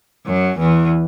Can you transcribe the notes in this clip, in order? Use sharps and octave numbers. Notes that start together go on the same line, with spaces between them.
F#2 F#3
E2 E3